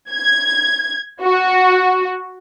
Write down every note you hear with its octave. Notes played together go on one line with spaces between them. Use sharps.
G#6
F#4